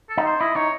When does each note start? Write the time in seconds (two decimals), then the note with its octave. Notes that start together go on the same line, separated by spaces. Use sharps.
0.09 A4
0.17 D#4
0.25 C5
0.40 E4 D#5
0.56 D#4 C#5